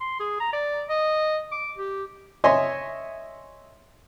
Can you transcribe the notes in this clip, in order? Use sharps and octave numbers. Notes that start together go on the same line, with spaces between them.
C6
G#4
A#5
D5
D#5
D6
G4
C#5 D#5 E5 G#5 C6